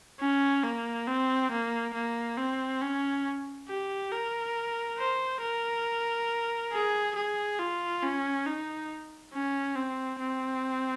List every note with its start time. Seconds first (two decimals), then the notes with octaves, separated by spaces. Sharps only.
0.20 C#4
0.63 A#3
1.08 C4
1.51 A#3
1.94 A#3
2.38 C4
2.81 C#4
3.68 G4
4.12 A#4
4.98 C5
5.42 A#4
6.72 G#4
7.15 G#4
7.59 F4
8.03 C#4
8.46 D#4
9.33 C#4
9.76 C4
10.20 C4